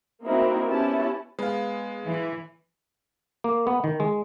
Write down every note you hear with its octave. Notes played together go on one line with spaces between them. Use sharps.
A#3 C4 D#4 E4 F#4 A#4
B3 C#4 E4 G4 A5
G#3 B3 F5
E3
A#3
B3
D#3
G#3